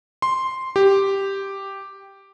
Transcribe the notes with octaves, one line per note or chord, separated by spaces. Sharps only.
C6
G4